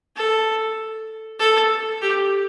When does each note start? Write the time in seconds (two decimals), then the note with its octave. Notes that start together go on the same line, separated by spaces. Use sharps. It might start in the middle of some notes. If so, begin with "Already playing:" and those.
0.16 A4
1.39 A4
2.02 G4